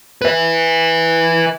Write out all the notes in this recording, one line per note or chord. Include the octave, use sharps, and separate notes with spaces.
B4 E5